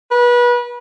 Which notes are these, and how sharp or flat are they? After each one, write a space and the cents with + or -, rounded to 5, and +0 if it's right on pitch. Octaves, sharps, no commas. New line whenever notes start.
B4 -30